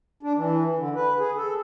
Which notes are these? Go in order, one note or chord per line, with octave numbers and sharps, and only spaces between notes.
D4
E3
D3
B4
G#4
A4